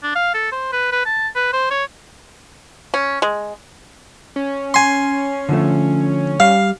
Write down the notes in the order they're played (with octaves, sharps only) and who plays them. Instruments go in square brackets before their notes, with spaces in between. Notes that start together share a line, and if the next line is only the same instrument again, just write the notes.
[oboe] D4
F5
A4
C5
B4
B4
A5
B4
C5
C#5
[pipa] C#4
G#3
[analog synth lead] C#4
[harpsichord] G#5 C6
[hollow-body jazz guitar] D3 F3 A3
[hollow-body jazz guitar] G3 [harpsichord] F5